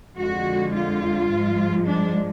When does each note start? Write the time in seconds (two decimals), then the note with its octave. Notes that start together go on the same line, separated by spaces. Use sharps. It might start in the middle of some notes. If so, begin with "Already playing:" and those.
0.17 F2 D3 G#3 F#4
0.74 F4
1.30 G#2 F3 G#3
1.87 D4